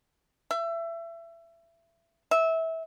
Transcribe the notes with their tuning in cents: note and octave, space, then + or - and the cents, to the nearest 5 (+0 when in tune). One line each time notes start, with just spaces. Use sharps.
E5 +25
E5 -20